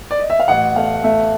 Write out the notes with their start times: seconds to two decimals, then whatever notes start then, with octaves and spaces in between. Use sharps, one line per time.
0.11 D5
0.20 D#5
0.30 E5
0.40 F5
0.48 A1 F#5
0.76 A3 F5
1.04 A3 E5